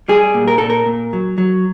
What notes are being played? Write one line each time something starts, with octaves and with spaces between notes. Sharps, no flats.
G3 G#4
A#2
A#4
A#2 A4
A#4
A#2
F#3
F#3